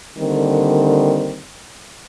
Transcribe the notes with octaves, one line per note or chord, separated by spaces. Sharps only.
D3 D#3 G3 A#3 C4